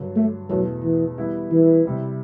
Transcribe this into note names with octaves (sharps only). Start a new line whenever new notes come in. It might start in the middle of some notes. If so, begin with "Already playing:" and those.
Already playing: G2 D3 F#3
A3
E2 B2 F#3 A3
E3
E3 G3 B3 E4
E3
C3 G3 C4 E4